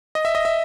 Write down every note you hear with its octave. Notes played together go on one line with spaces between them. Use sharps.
D#5
E5
D#5
E5